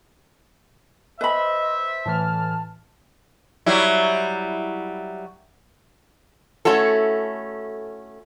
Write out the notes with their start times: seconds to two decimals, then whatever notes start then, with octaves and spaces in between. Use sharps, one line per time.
1.21 B4 C5 D#5 E5 B5
2.06 A2 E3 A5 F6
3.66 F#3 G3 E4
6.65 A3 C#4 E4 F#4 A4